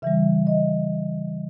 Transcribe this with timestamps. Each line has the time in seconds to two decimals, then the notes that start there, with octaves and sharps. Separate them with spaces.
0.02 C#3 E3 G3 E5
0.47 D#5